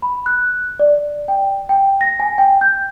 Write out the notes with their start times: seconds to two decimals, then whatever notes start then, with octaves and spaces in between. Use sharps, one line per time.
0.02 B5
0.26 F#6
0.79 D5
1.28 G5
1.69 G5
2.01 A#6
2.20 G#5
2.38 G5
2.61 G6